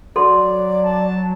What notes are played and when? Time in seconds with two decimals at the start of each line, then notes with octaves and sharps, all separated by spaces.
0.16 F#3 A4 D5 C6
0.85 A5